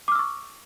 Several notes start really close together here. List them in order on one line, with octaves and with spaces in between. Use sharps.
D6 F6 E6 C#6